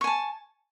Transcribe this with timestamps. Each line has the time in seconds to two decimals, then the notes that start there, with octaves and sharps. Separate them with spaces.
0.01 C#6
0.04 G#5
0.07 A5